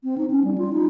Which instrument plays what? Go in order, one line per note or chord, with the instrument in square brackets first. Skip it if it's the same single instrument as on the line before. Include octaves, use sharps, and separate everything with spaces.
[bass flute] C4
D#4
C#4
G3
F4
D#4